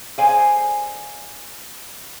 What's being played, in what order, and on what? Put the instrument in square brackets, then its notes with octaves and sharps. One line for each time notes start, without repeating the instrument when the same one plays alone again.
[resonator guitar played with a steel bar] G#4 A4 C5 D5 F5 G#5